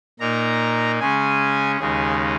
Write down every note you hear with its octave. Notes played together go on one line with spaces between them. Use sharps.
A#2 A#3 D#4 A#5
C#3 G#3 C#4 G#5
D#2 C#3 G#3 D#4 G#4